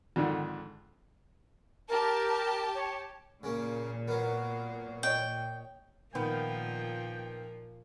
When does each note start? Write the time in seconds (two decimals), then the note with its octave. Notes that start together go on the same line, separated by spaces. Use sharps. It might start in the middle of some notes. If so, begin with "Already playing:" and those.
0.16 F2 G#2 D3 D#3
1.89 G4 A#4 A5
2.75 C#5
3.43 A#2 C#3 A#3
4.08 F#3 B3 A#4
5.03 C#5 D#5 G5
6.15 A#2 D#3 F3 A#3 B3 G5